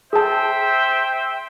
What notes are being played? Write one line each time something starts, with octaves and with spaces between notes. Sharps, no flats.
G#4 C5 E5 G5 A5